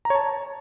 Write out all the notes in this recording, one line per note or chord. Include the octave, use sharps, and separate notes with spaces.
A#5
C#5
A5